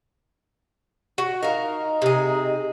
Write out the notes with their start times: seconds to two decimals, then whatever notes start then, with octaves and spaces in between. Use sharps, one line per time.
1.18 F#4
1.43 D#4 A#4 F5
2.02 C3 G#4